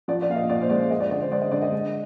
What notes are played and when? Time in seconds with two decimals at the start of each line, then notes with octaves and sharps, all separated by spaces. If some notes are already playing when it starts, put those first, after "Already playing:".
0.08 F3 D5
0.22 D5
0.29 A#2 F5
0.36 D#5
0.49 A#2 D5
0.62 C5
0.70 G#3 D5
0.91 G#3 D#5
1.00 D5
1.11 D3 D5
1.21 C5
1.31 G#3 D5
1.41 D#5
1.52 D3 D5
1.62 D#5
1.72 G#3